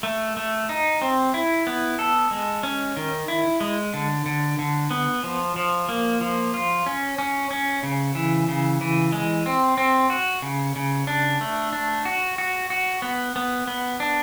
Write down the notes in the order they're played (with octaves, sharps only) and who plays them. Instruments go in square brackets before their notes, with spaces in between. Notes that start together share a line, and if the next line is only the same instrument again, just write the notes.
[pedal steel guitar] A3
A3
D#4
C4
E4
B3
A4
G#3
C#4
D#3
E4
G#3
D3
D3
D3
B3
F3
F3
A#3
F3
F4
C#4
C#4
C#4
C#3
E3
C#3
E3
G#3
C4
C4
F#4
C#3
C#3
D4
A3
D4
F#4
F#4
F#4
B3
B3
B3
D4